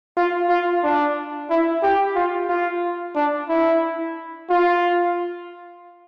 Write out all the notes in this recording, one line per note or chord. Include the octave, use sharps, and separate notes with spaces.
F4
F4
D4
E4
G4
F4
F4
D4
E4
F4